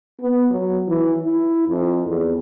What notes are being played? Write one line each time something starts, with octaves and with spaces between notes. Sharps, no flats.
B3
F#3
E3
E4
F2
E2